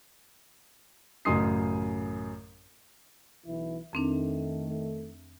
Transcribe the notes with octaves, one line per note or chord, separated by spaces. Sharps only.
A1 F#2 C#3 C6 D#6 C7
B1 E3 E4
F2 D#3 A3 C4 D4